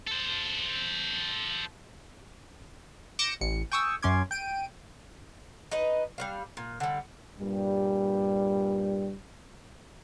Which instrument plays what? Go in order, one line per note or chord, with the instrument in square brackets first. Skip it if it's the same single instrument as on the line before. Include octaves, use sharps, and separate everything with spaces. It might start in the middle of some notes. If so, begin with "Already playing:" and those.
[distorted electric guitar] A4 C5
[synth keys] D6 G6 A#6 C#7 D7 E7
A1 C#7
G5 G#5 C#6 D#6 E6
F#2 C#4 C6 D6 G#6
G5 D7 D#7
[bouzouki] D#4 B4 D#5
G3 D4 F5
A#2
D3 G3
[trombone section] G2 A#2 G3